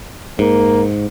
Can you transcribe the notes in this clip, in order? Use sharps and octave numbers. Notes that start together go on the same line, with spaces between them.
G#2 A#3